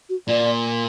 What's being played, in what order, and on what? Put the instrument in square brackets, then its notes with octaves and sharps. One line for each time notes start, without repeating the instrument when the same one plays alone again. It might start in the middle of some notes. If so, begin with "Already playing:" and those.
[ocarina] F#4
[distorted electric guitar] A#2 [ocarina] D5